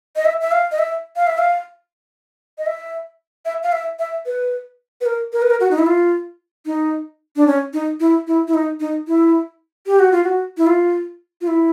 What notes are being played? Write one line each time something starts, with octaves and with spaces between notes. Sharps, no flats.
D#5
E5
E5
F5
D#5
E5
F5
E5
F5
D#5
E5
E5
F5
E5
E5
B4
B4
A#4
A#4
B4
A#4
F#4
D#4
E4
F4
D#4
D4
C#4
D#4
E4
E4
E4
D#4
D#4
E4
G4
F#4
F4
F#4
E4
F4
F4
E4